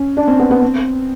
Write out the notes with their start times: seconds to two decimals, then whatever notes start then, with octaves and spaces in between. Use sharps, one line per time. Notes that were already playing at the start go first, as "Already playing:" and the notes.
Already playing: C#4
0.17 D4
0.27 C4
0.40 B3
0.51 B3
0.62 C4